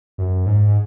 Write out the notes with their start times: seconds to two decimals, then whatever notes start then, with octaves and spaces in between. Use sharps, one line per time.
0.18 F#2
0.46 G#2